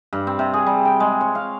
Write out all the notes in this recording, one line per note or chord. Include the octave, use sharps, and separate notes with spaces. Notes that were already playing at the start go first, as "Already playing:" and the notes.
G2
C4
C3
G#4
G3
G5
G#3
C#5
F5